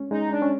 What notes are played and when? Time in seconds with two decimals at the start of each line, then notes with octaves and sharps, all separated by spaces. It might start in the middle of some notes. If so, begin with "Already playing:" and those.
Already playing: G#3 C#4
0.11 G#3 D#4
0.32 D4
0.42 C#4